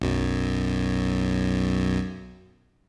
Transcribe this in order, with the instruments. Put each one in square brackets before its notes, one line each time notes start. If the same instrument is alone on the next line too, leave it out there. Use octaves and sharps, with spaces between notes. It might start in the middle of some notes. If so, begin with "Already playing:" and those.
[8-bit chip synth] B1 F#2